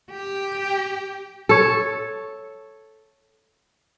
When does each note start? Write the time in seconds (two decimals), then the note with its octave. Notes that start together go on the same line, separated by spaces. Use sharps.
0.12 G4
1.49 A4 C#5